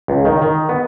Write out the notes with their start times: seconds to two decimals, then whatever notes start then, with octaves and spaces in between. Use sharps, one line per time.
0.08 C#2
0.25 D#3
0.42 D#3
0.69 B3